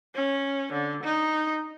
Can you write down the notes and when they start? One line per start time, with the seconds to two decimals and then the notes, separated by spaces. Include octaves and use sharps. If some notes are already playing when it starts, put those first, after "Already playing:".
0.15 C#4
0.73 D3
1.03 D#4